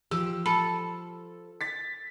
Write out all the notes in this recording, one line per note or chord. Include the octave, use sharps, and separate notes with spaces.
F3 G4 E6
A4 B5
A6 B6